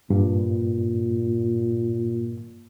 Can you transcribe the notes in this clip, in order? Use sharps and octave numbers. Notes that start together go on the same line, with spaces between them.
G2 A#2